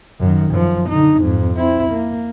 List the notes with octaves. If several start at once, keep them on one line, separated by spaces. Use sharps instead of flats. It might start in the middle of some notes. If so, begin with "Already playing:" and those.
F#2 D#3
F#2 F3
D3 D#4
F2 G#2
C4 E4
A#3